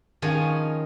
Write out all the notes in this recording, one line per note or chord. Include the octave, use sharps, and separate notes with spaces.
D#3 F3 C#4 F4 G#4 C#5